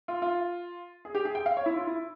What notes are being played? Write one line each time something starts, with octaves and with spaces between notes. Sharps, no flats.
F4
F4
G#4
G4
G#4
G5
F5
C#5
E4
F4
E4